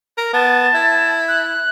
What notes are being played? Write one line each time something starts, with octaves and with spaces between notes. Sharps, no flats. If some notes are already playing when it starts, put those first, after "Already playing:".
A#4
B3 A5
E4
F#6